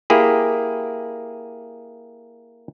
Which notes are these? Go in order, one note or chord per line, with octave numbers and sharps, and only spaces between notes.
A#3 E4 G4 G#4